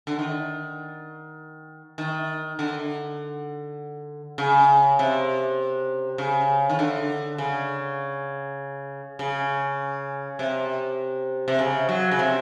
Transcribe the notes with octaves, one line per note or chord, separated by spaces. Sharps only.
D3
D#3
D#3
D3
C#3
C3
C#3
D#3
D3
C#3
C#3
C3
C3
C#3
F#3
C#3
C3